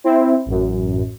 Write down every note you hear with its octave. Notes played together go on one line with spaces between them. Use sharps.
C4 E4
A1 F#2